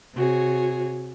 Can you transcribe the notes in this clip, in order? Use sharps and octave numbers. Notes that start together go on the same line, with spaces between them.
C3 F#4 G#4 C#5